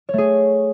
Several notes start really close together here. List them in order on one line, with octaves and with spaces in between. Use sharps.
C#5 A3 G#4